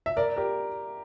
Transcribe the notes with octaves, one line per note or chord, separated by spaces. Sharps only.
E5
A#4 D5
G4 A#4